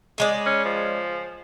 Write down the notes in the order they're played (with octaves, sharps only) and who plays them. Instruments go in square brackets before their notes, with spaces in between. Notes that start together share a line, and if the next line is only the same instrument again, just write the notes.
[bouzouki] C#3 G#3 D5
[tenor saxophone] C#4
F3